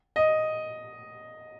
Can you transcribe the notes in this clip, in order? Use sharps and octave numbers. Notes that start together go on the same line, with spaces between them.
D#5